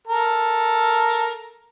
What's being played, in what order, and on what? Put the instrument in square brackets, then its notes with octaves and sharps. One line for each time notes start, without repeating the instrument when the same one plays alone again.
[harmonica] A4 A#4